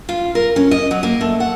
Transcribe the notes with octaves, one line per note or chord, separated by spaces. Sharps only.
F4
A#4
C#4
D#5
F#3
A#3
A3
F#5